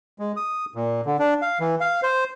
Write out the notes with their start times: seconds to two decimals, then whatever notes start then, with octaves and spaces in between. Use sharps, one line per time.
0.19 G#3
0.36 D#6
0.75 A#2
1.06 D3
1.19 D4
1.42 F5
1.60 E3
1.80 F5
2.03 C5